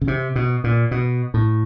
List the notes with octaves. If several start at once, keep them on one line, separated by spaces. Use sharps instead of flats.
C#3
C3
B2
A#2
B2
A2